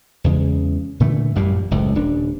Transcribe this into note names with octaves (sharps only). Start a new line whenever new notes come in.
E2 C#3 G#3
A#2 D3 E3 A3
A1 F#2 A#2 G3
F#1 C#2 A2
D#1 D4